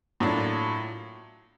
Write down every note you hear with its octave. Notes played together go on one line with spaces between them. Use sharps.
A2 F#3 A#3 D4 F4